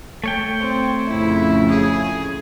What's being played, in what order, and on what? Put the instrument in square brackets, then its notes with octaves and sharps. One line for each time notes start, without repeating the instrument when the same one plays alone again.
[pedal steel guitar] A3 C#5 G5
[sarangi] C4
[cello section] F2 A2 C#3 [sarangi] E4
[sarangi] G#4